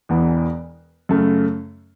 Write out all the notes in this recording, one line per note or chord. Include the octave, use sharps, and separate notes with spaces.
E1 E2 E3 B3
F#2 C#3 A3